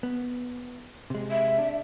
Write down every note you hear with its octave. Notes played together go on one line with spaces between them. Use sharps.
B3
C3 G#3
E5
D4